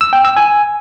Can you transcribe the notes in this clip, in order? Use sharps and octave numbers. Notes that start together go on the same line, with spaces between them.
E6
G5
E6
G#5